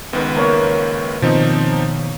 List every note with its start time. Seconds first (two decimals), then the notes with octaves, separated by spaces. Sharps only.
0.13 C#2 D#3 B3 B4
0.36 A#3 C#5 E5
1.22 B2 D#3 F3 C4 D#4